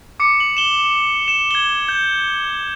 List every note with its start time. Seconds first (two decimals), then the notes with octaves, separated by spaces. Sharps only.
0.20 D6 C#7
0.40 F#7
0.57 E7 G7
1.28 E7
1.51 G#6 G7
1.88 G6